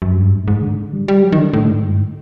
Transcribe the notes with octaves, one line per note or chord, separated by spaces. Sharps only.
F#2
G2
G#2
A2
G#2
D3
G3
G3
F#3
D#3
D3
A2
G#2
G2